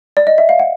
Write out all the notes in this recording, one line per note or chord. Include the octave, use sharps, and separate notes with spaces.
D5
D#5
E5
F5
F#5